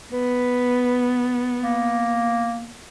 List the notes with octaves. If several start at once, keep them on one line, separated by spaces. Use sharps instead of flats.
B3 B4
A#3